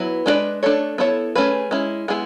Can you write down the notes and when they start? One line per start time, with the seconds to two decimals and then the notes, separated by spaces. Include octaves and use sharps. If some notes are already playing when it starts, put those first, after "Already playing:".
Already playing: F#3 B3 E4 B4
0.26 G#3 D4 F#4 B4 D5
0.63 A3 D4 A4 C#5
0.98 B3 E4 A4 C#5
1.35 A3 C#4 G#4 B4
1.71 G#3 C#4 E4
2.08 G#3 B3 E4 G#4